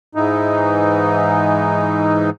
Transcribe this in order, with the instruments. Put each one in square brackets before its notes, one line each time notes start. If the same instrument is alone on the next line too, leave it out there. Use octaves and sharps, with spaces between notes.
[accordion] G#2 E3 D#4